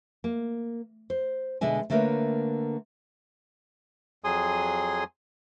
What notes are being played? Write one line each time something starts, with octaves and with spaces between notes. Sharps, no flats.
A#3
C5
B2 D3 G#3 E5 G#5
D3 A3 A#3 A#4 B4 C#5
F2 F#3 G#4 G#5 C6 D#6